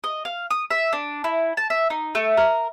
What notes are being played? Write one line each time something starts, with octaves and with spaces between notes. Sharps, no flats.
D#5
F5
D#6
E5
D4
E4
A5
E5
D#4
A3
A#4